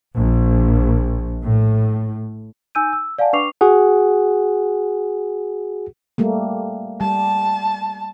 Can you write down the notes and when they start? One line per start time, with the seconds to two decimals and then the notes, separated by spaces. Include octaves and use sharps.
0.17 A#1
1.43 A2
2.75 D#4 G#5 E6 G6 D#7
2.93 E6
3.19 D5 F5 F#5 G#5 A5
3.33 D4 B4 C#6 D6 C7 F7
3.61 F#4 G#4 F#5
6.18 G3 A3 A#3
7.01 G3 A5